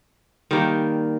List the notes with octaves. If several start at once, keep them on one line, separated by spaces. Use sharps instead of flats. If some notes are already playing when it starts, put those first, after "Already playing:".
D#3 G3 A#3